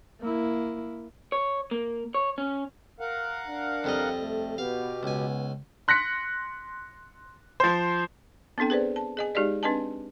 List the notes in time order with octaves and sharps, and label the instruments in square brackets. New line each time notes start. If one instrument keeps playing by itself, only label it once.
[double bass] A#3 E4
[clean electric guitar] C#5
A#3
C#5
C#4
[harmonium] A#4 F5 F#5
[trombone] D4
[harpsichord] F2 G3 D#5
[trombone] A3
[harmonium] B2 G4 [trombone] B3 [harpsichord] F5
[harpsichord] C#2 G#5 [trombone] B3
[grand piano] C6 F#6 A#6 B6 C#7
F3 C5
[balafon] B3 C4 D4 A4 G5
G#4 B4 C5 D5
A5
G#4 D#5 G#5
G#3 D#4 G4 G#4 D5 D#5
C4 D4 B4 D#5 G#5 A5